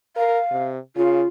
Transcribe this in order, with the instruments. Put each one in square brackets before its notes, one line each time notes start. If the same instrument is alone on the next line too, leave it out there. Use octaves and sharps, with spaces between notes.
[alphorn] A#4 [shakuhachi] F5
[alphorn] C3
[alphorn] C#3 [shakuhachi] F4